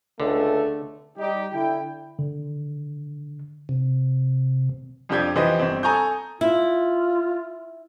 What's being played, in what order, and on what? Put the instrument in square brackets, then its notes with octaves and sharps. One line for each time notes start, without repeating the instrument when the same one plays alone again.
[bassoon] C#2 [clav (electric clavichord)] D3 [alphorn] A3
[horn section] G3 D#4 G4
D3 E4 G5
[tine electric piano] D3
[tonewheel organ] C3
[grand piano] F2 F3 D4 G4 G6 G#6
E3 F3 G4 B4 C5 D#5
G1 C4
A4 G#5 A#5 C#6 D#6 G6
[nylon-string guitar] E4 [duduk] F4